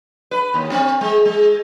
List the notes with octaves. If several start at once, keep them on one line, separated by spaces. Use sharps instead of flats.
B4
D#2
C4
G#3
G#3